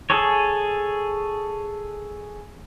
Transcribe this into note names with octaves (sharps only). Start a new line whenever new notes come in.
G#4 A4 C#5